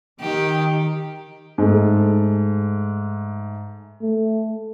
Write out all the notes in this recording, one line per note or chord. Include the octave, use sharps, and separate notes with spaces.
D#3 G4
G#2 A3
A3